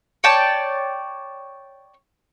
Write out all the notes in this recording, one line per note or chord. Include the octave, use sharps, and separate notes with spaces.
C#5 D5 G5 A5